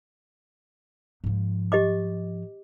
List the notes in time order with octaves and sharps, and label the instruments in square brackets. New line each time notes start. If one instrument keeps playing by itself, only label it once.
[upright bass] G#2 F3
[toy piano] G4 D#5 D6